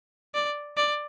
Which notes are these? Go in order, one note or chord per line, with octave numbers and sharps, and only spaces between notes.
D5
D5